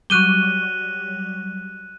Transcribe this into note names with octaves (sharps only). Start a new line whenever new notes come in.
F#3 G3 F#6 D#7 G7